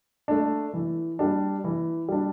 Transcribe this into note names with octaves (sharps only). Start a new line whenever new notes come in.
A3 D4
E3
G3 D4
E3
G3 D4